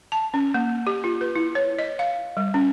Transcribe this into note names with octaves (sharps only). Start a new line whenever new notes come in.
A5
C#4
A#3
G4
F4
B4
E4
C#5
D#5
F5
G3
C#4